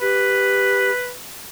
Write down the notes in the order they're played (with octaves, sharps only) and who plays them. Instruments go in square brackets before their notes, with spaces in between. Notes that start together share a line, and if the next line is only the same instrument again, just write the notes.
[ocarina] G4 [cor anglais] B4